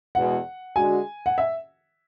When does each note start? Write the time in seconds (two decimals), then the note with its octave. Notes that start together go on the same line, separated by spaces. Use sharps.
0.15 E2 B2 G#3 F#5
0.76 D3 G#3 D4 F#4 G#5
1.26 F#5
1.38 E5